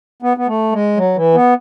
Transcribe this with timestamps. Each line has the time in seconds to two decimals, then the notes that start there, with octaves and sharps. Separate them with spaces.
0.22 B3
0.37 B3
0.48 A3
0.72 G#3
0.97 F#3
1.16 E3
1.34 B3